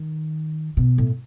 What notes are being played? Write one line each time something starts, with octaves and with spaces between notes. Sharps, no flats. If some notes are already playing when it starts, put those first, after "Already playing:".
Already playing: D#3
B2
A2